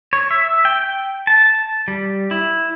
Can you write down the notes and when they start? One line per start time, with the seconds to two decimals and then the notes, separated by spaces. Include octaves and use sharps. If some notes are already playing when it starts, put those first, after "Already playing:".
0.13 C#5
0.31 E5
0.65 G5
1.27 A5
1.88 G3
2.31 E4